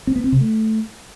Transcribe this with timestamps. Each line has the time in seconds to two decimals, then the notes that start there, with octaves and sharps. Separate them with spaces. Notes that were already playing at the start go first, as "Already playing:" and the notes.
0.07 C4
0.16 B3
0.24 C4
0.32 C3
0.41 A3